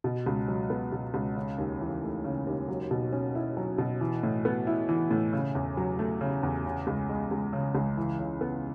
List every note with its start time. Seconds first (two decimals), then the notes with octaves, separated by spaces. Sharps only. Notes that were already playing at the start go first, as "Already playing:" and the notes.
0.04 B2
0.26 C#2
0.48 F#3
0.70 B3
0.93 B2
1.14 C#2
1.36 C#3
1.58 D#2
1.80 E3
2.02 A3
2.24 C#3
2.47 D#2
2.68 F#3
2.91 B2
3.12 C#4
3.35 E4
3.57 F#3
3.78 B2
4.01 E3
4.23 A2
4.45 B3
4.67 E4
4.89 E3
5.11 A2
5.33 C#3
5.55 E2
5.77 F#3
5.99 A3
6.21 C#3
6.43 E2
6.65 C#3
6.87 C#2
7.09 G#3
7.31 C#2
7.53 C#3
7.75 C#2
7.97 E3
8.19 C#3
8.41 B3